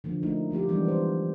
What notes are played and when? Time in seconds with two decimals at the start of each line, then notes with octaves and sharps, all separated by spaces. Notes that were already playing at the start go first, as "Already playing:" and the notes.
0.04 D3 F3 A#3
0.23 A3 A#3 D#4 E4
0.51 F3 A#3 F4 G4
0.69 E3 G3 G#3 B3 D4
0.85 A#4 C5